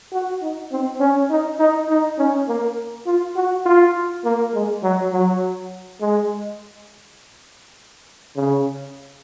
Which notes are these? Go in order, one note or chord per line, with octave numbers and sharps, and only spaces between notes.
F#4
D#4
C4
C#4
D#4
D#4
D#4
C#4
A#3
F4
F#4
F4
A#3
G#3
F#3
F#3
G#3
C#3